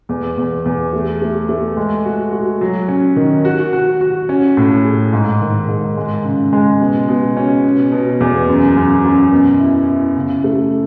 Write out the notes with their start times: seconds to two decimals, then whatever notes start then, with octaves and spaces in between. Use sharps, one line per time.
0.09 E2
0.38 E2
0.66 E2
0.93 A3
1.22 A3
1.49 A3
1.77 G#3
2.05 F#4
2.32 F#4
2.61 F#3
2.88 C#4
3.16 D#3
3.45 F#4
3.73 F#4
4.01 F#4
4.29 C#4
4.57 A2
4.84 G#4
5.13 G#2
5.41 D#3
5.68 G#2
5.97 G#3
6.25 C#3
6.53 G#3
6.80 B2
7.09 B2
7.37 C#4
7.64 B2
7.92 B2
8.21 E2
8.49 F#2
8.76 F#2
9.04 F#2
9.32 B2
9.59 E4
9.88 E4
10.16 C#3
10.44 A3